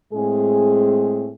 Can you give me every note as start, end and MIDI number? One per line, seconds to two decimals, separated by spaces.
0.13 1.31 45
0.13 1.31 56
0.13 1.31 60
0.13 1.31 68